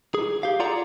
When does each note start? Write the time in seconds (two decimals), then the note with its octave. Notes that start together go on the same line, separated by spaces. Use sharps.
0.15 G#4
0.43 G4 F5
0.60 F4 G#4 A4 D5 F#5 A#5